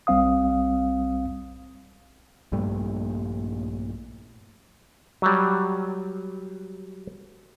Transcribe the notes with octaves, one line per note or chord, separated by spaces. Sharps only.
B1 G3 C4 F5 D#6
A#1 G2 G3 A3
F#3 G3